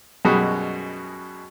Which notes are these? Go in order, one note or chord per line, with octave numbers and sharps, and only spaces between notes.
F#2 B2 G3 G#3 F#4 D#6